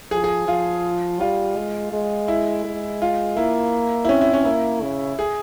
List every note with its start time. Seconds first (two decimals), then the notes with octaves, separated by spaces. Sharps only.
0.11 F3 G#4
0.24 G#4
0.48 F3 F4
1.21 G3 F4
1.57 G#3
1.93 G#3
2.28 E4
2.65 G#3
3.02 F4
3.37 A#3 E4
4.05 E4
4.09 C4 C#4
4.21 E4
4.34 C#4
4.45 A#3 E4
4.82 C#3
5.19 G#4